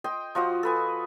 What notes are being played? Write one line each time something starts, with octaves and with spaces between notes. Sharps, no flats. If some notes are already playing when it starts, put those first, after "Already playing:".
D#5 G5 C6
F3 F#4 C5 D#5
A4 B4 G#5